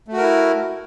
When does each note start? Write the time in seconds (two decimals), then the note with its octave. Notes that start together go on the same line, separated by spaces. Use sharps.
0.08 A3
0.13 F#4
0.17 A#4
0.22 E4